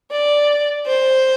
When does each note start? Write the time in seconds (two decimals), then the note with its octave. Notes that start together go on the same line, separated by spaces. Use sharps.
0.11 D5
0.87 C5